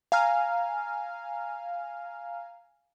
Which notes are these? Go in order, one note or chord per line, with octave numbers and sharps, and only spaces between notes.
F5 G#5 A#5 F6